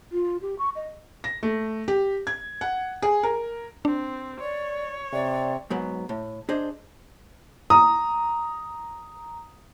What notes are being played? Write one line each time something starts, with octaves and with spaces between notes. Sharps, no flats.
F4
G4
C#6
D#5
A#6
A3
G4
G#6
F#5
G#4
A#4
C4 D4
C#5 D5
C3 D5
G#2 F#3 B3
A2
D4 G#4 C5 D#5
A#5 D#6